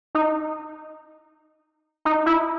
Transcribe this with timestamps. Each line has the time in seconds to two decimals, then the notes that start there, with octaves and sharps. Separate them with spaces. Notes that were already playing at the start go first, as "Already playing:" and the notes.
0.15 D#4
2.05 D#4
2.26 E4